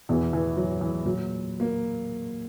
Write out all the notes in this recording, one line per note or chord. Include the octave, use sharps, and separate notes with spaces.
E2 B2 E3
E3
F#3
E3
A#2 F#3
A#3